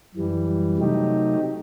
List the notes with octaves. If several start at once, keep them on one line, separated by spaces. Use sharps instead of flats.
F#2 E3 G3
C3 F#3 A3 D#4 G4